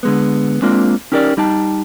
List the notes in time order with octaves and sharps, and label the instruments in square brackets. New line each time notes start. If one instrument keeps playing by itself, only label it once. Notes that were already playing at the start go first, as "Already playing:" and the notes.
[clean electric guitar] D3 G#3 B3
G#3 A#3 C4 D4 F4
C#4 D#4 G4 A#4 B4 D5
G3 D#4 G5 A5